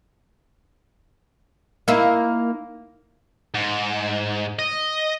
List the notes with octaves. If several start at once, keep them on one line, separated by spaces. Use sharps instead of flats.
A#3 D#4 E4
G#2
D#5